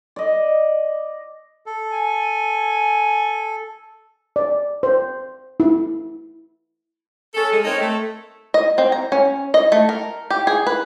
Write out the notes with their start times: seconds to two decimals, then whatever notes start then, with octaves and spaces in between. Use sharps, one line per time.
0.16 D5 D#5
1.66 A4
1.92 G#5
4.36 D5
4.83 C5
5.60 E4
7.35 C#4 A4
7.51 G#3
7.64 C4 D#4 A4 A#4 C#5
7.80 A3
8.54 D#5
8.78 C4
8.92 A#5
9.12 C#4
9.54 D#5
9.72 A3
9.89 A#4
10.30 G4
10.47 G#4
10.67 B4